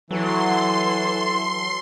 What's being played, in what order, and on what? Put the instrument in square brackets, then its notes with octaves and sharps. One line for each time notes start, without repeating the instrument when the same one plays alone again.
[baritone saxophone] E3 [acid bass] F#3 [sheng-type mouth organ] A4 [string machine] C6